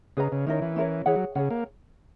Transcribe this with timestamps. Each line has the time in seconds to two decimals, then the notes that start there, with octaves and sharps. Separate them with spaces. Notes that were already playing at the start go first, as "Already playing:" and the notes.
0.17 C#3 G#4 B4 D#5 A#5
0.32 C#3
0.47 D#3 C#4 E4 A#4 C#5
0.62 E3
0.76 C#4 E4 A#4 C#5
1.06 E3 G#4 C#5 F#5
1.16 F#3
1.35 C#3 G#4 C#5 F#5
1.50 A#3